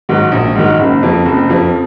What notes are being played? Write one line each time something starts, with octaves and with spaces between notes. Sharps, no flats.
G#2 D#3 F#3
A#1
G#2 D#3 F#3
F#1
F2 F3
F#1
F2 F3